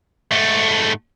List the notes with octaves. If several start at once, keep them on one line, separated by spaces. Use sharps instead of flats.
G#2 A3